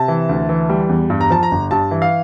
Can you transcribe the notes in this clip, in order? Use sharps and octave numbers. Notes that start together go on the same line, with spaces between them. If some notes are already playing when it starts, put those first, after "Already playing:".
Already playing: C3 A5
E3
D2
E3
G3
E2
G2
A#5
F3 A5
A#5
G1
G2 A5
E3
F5